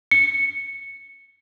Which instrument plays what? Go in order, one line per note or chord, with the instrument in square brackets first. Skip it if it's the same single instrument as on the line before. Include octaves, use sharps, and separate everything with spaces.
[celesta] C#7